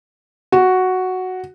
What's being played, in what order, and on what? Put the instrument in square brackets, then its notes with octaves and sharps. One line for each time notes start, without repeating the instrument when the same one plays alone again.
[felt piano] F#4